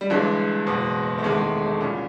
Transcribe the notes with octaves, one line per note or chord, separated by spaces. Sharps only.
G3
G1 G2 E3 G#3
F#1 E2 B2
A3
E1 E2 C3 D#3 G#3
A3
G#3
A3
C2 A#2 C#4